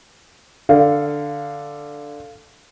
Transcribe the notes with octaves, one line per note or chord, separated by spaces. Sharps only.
D3 F5